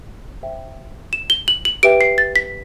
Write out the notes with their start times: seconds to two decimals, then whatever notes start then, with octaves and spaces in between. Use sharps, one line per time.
0.43 C5 E5 G5
1.13 E7
1.30 G7
1.48 F#7
1.65 F#7
1.83 G4 B4 E5 G5 D7
2.01 C7
2.18 A6
2.36 B6